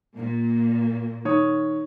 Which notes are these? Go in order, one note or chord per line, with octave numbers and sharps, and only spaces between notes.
A#2
D#3 C#5 D#6